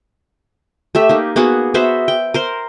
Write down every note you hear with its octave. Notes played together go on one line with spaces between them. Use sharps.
A3 G4 E5
A#3 D#4
A#3 B3 F#4 G#4
B3 F#4 C5 E5
G5
A#4 C5 C6